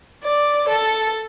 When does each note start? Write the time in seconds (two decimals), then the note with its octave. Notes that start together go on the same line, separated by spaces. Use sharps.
0.24 D5
0.69 A4